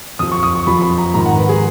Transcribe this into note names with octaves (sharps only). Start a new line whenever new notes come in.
F2 F3 D#6
C#6
D#6
C#6
F2 F3 B5
B5
A#5
G#2 D#3 A#5
F#5
B4
G#4